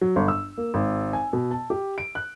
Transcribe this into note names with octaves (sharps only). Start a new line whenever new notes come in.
F#3
G1
E6
A#3
G#1
G#5
B2
A5
G4
D7
F#6